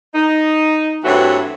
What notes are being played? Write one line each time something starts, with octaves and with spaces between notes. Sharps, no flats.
D#4
G2 E3 A3 C4 F#4 C#5